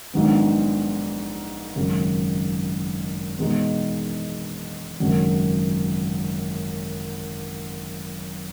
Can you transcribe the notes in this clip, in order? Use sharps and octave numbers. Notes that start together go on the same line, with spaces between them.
A#1 G#2 D#3 F#3 B3
G#1 F#2 C#3 F#3
E2 B2 G#3 D#4
G#1 F#2 C#3 F#3